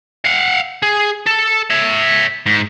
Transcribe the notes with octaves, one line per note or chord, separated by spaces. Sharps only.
F5 F#5
G#4
A4
C#5 E5
G#2